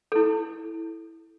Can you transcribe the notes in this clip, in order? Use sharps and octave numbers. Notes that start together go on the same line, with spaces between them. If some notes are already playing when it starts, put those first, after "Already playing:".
E4 A4